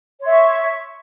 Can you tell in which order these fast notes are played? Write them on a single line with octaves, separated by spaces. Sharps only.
C#5 C6 E5 C#6